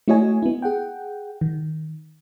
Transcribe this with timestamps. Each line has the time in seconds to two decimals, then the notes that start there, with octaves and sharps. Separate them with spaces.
0.08 A3 E4 F#4 C#5 D#5 G#5
0.42 B3 E4
0.62 G#4 F#5 G5
1.41 D#3